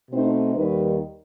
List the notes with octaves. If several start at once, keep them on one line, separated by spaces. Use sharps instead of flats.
B2 A3 C4 D#4 C5
D#2 D#3 G3 D#4 B4